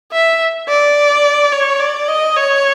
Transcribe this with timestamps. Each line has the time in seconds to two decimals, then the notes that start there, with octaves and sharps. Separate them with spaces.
0.12 E5
0.68 D5
1.52 C#5
1.80 D5
2.08 D#5
2.36 C#5